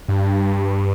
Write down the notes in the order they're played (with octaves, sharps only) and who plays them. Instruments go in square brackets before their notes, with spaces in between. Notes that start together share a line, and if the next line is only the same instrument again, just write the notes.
[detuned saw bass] G2